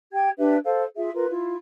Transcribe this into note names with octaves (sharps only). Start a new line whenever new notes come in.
G4 G5 G#6
D4 G4 B4 E5
A4 C5 F5
F4 G#4 E5
F4 A#4 B4
E4 F4